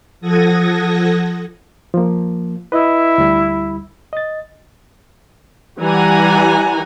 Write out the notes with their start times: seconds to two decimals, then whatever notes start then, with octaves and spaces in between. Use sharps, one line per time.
0.21 F3 A4 F#5 D#6 G#6 A#6
1.94 F3 A#3
2.72 E4 B4 D#5
3.18 D2 G3
4.13 D#5 A6
5.79 E3 G3 F#5 G#5 A#5